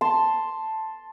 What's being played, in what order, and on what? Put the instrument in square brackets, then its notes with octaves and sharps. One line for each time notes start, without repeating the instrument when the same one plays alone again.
[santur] A5 C6